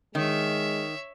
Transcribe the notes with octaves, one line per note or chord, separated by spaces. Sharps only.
D#3 G#3 C#5 E5